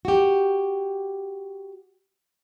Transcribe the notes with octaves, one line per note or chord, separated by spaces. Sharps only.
F#4 G4